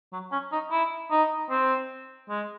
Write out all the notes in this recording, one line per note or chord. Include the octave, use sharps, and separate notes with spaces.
F#3
C#4
D#4
E4
D#4
C4
G#3